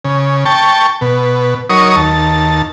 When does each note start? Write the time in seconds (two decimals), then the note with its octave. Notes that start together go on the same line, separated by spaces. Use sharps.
0.05 C#3
0.45 G5 A5 C#6
1.01 B2
1.70 F#3 D#4 A#4 C#5 C#6 D#6
1.96 D#2 A5